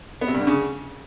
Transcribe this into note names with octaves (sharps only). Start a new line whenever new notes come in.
B3
C3
G2
D3
C#3